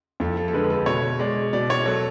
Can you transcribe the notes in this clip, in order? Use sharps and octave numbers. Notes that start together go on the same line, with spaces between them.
F2 A4
A4
A4
D3 G#3 B4
B4
A4
B2 C#5
G#3 D5
B2 D5
C#5
F#3 A4